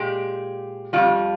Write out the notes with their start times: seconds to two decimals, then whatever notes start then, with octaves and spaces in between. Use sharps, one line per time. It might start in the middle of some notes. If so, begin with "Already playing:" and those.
Already playing: A#2 G#3 G4
0.93 D#3 G3 F4
0.98 F2